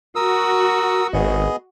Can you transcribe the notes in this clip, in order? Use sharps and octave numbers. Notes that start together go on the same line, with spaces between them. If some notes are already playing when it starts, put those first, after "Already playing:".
F#4 A#4 D#6 E6
G#1 B3 G#4 D#5